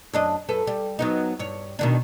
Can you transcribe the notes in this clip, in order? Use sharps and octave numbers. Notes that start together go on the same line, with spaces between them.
F#2 D4 D#5
F#2 A4 B4
G3
F#3 B3 D#4
G2 C#5
B2 D#3 D4